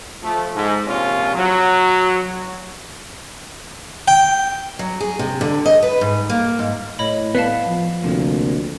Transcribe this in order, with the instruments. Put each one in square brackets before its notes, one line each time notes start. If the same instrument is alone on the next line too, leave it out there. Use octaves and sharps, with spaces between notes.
[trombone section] F3 A3
G#2
A#1 C3 C#4 F4
F#3
[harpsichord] G5
[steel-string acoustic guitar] F#3
G#4
C3
D3
D#5
B4
G#2
A#3
G#2
[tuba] A2 [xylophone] C#5 D#5 B5
[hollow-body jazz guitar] B3 [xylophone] D5 F5 A5
[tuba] F3
[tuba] D2 [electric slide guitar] C3 F3 A#3